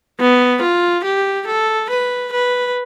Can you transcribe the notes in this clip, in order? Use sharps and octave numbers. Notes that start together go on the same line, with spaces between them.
B3
F4
G4
A4
B4
B4